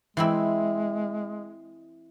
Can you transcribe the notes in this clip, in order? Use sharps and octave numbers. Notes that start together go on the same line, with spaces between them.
E3 G#3 C4 E4